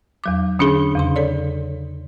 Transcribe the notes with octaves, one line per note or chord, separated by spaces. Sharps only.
E2 F#3 D6
D3 C#4 D4 G#4
E2 C#3 C6
A4 C#5 D5